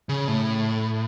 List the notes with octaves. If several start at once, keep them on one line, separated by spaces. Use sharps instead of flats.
C#3
A2